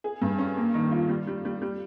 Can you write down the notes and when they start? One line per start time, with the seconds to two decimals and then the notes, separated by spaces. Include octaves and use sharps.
0.04 G#4
0.22 G2
0.38 C#4
0.57 A#3
0.74 D#3
0.91 F4
1.09 G3
1.27 G3
1.45 G3
1.62 G3